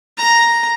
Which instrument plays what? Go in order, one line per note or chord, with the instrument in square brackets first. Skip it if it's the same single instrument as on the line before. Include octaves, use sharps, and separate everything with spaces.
[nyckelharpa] A#5